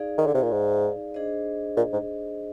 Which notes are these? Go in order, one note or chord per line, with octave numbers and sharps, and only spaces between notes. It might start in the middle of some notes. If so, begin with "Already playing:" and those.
Already playing: D#4 G#4 D5 F5
D#3
D3
C3
A#2
G#2
D4 G#4 C5 D#5
A#2
G#2